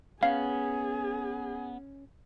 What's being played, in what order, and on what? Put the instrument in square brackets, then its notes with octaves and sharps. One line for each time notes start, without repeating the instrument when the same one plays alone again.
[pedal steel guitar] B3 [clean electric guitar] C#4 [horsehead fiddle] G#4 [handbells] F5